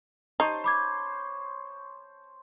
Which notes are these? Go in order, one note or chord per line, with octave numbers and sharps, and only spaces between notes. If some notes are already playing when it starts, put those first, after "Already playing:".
D#4 C5 C#5 A5
B5 D6 G#6